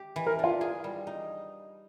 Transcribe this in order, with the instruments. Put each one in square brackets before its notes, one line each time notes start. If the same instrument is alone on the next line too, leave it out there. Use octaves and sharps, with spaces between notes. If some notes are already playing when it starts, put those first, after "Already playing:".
Already playing: [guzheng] G4
E3
[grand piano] A#4
[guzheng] D4 [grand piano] F4
[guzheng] G#4
G3
D#4